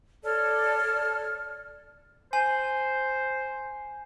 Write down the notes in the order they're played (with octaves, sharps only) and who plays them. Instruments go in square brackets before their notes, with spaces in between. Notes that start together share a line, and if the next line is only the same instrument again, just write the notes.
[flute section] A4 C#5 D5 F6
[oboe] C5 [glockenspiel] G#5